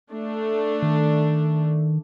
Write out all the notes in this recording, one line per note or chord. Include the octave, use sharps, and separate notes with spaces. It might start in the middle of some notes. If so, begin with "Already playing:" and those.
A3 D4
D#3